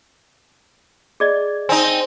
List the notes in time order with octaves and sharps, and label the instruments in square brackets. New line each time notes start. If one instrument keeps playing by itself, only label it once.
[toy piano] G#4 D5 D#5
[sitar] C4 D#4 [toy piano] G#5